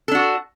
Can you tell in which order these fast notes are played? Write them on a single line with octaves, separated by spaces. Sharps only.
A4 D4 F#4